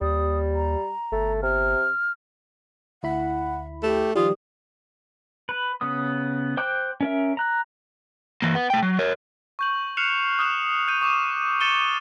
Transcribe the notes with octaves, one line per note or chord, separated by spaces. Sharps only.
D#2 G3 D#6
A#5
G1 A3
C3 F6
D2 E4 F#5 B5
A3 G4
D#3 F3 G3 F4 D#6
B4
C#3 B3 D#6
C5 G5 D6 F#6
C#4 A#4 E5
A#5 F#6
E3 A#3
B3
A3 G5
F#3
A#4 C#5
C#6 G6 F#7
F6 F#6 C7 C#7 E7 F7
D#6 F6 F#6 E7
F#6 G6 D#7 F7
C#6 D6 E7
D6 A6 C#7 D#7 E7 G7